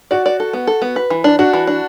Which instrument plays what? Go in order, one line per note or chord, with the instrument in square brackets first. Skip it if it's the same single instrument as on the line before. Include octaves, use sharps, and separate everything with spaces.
[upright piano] F#4 [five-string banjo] D5
[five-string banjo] D5
A4
B3
A4
B3
B4
E3
D4
[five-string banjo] D4 [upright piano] F#4
[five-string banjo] E3
D4